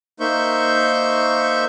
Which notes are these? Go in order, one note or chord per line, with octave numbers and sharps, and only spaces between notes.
A#3 D#4 C5 E5 C#6 G6